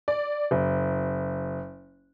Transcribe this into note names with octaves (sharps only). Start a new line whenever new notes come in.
D5
F#1